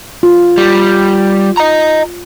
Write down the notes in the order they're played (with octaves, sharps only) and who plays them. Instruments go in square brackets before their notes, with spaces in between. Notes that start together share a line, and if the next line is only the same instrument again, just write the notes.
[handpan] F4
[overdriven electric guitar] G3
D#5 A#5